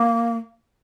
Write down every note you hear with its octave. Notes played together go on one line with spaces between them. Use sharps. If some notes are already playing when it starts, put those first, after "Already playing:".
Already playing: A#3